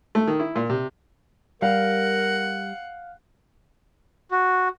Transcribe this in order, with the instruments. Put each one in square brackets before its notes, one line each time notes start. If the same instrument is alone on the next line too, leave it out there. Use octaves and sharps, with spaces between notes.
[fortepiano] A3
D#3
E4
A#2
C3
[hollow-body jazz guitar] G3 [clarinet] A#4 [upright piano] F5 [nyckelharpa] F#5
[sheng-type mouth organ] F#4